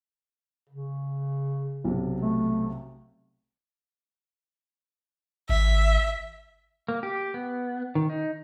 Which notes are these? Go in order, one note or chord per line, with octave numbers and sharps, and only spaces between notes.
C#3
B1 C3
A3
G#1 E5
A#3
G4
B3
D#3
D#4